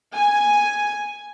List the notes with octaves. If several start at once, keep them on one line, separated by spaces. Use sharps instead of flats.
G#5